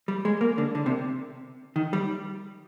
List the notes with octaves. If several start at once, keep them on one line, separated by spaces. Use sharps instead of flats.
G3
G#3
A#3
D3
D3
C3
D#3
G3